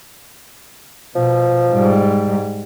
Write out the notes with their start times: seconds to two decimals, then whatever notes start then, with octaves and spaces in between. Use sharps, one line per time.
1.16 B2 F3
1.72 G#2 G3